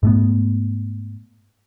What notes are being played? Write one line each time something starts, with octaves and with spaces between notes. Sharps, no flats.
G#2 A3 B3